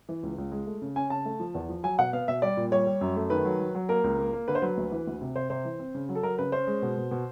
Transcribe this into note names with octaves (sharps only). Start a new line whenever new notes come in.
E3
C#2
C#2
G#3
A3
C#3
C#4 G#5
C#3 A5
A3
F3
E2
F3
F#3 G#5
B2 F#5
B3 F5
B2 E5
G3 D5
A#2
G3 C#5
G3
F#2
A3
D#3 B4
F#3
F#3
F#3
A#3 A#4
C#2
A#3
A#3
D3 B4
C5
F#3 B4
D2
E3
D2
C3
C3 C5
C3 C5
E3
C4
C#3
F#3
A4
F#3 A#4
C#3 B4
C#4 C5
G#3
B2
B2
B2